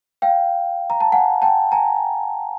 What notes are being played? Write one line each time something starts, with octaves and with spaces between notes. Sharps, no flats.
F5 G5
A#5
A5
F#5 G#5
G5 A5
G#5 A#5